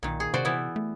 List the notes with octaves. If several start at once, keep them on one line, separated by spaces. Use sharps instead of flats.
B1 A#2 D#3
G#4
C3 F#4 C5 D5
E3 B3 E4
A3